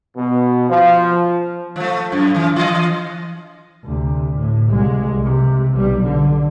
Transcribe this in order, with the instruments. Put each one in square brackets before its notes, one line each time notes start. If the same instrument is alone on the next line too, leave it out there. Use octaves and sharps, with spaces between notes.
[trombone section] B2
F3
[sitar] F3 A3
F#2 A2
E3 F3
E3 D#5
[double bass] D2 C3
A2
C2 G#3
C3
B1 G3
D3